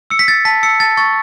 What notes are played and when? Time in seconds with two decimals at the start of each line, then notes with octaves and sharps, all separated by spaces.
0.10 E6 C#7
0.19 B6
0.28 E6 A6
0.45 A5 B6
0.63 E6 C#7
0.80 A5 A6
0.97 C#6 A6